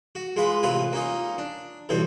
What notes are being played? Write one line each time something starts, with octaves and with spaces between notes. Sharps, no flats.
F#4
G#3 F4 B4
A1 C3 F4 B4 G#5
A#3 C#4 D#4 F4
D4
B1 A2 E3 G3 C5